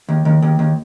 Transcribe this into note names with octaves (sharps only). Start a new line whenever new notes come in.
D#2
D#2
D#2
D#2